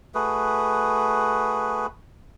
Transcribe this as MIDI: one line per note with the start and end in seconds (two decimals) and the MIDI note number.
0.15 1.87 57
0.15 1.87 66
0.15 1.87 68
0.15 1.87 71